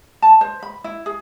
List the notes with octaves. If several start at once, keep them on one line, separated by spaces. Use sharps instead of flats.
A5
C5
B5
E4
G#4